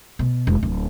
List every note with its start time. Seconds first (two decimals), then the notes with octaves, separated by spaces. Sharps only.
0.19 B2
0.47 E1
0.63 D1